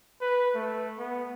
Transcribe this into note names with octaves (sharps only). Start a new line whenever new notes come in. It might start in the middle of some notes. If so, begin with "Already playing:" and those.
B4
A3
B3